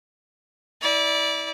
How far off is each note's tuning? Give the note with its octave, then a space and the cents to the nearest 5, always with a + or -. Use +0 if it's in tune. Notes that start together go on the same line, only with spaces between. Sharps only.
E4 -30 D5 -15